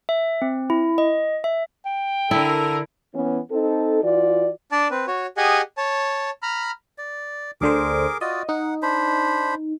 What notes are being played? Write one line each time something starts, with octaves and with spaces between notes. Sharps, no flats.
E5
C4
E4
D#5
E5
G5
D3 E4 A4 A#4
E3 B3 C#4
C4 D#4 A4
E3 F4 F#4 D5
D4 D5 A5
C4 B4
F#4 C#5
G4 G#4 D#5 F#5 G#5
C#5 A5
A#5 B5 F6
D5
D2 D3 G#4 A#4 C5 D6
F4 F#4 D5 D#5
D#4 F#5
D4 C5 B5